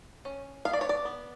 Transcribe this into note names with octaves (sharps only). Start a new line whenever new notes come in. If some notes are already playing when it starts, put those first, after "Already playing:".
C#4
B3 F5
D5
C#5
D5
B3